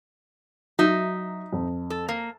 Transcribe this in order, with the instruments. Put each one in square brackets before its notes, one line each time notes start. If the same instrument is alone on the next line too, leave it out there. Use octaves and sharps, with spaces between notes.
[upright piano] F#3 [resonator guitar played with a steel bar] D#4 E5
[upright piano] F2
[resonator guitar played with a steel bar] A4
A#3